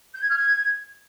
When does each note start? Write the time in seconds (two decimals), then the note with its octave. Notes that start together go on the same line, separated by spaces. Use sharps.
0.13 G6
0.21 G#6
0.28 F6
0.36 G#6